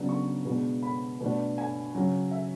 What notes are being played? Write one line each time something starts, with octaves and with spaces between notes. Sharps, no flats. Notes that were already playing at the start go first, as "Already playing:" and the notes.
Already playing: C#3 F#3 B3 D4
C#6
B2 G#3 B3 D4
B5
B2 A3 D4
G#5
C#3 F#3 C#4
E5